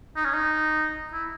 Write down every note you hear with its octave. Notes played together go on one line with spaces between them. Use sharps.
D#4
C#4
D#4
E4